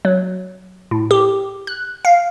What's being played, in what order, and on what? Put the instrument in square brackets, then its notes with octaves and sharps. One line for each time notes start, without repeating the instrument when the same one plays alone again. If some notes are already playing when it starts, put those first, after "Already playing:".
[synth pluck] F#3
A2
G4
F#6
F5